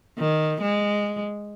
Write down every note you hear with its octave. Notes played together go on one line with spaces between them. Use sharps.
D#3
G#3